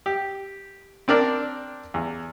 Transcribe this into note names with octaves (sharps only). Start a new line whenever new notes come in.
G4
C4 D4 A#4 D5
E2